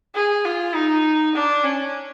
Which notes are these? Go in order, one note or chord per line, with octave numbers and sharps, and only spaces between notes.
G#4
F4
D#4
D4
C#4